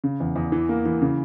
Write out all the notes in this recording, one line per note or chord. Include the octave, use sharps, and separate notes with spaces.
C#3
E2
E2
E3
A#3
E3
C#3